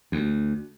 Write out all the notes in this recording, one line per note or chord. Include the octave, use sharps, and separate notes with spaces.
D2